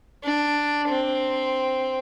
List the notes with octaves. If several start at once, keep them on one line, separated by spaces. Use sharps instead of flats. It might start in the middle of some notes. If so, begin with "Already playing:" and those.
D4
C4